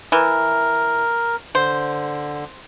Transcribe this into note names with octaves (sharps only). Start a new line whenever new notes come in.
E3 A#4
D3 C5